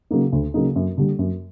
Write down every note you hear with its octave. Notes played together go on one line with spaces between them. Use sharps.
C#3 F#3 A#3 D#4
D2
C#3 F#3 A#3 D#4
F#2
D3 G3
F#2